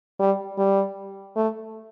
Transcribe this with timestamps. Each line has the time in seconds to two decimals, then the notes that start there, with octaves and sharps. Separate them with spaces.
0.19 G3
0.58 G3
1.36 A3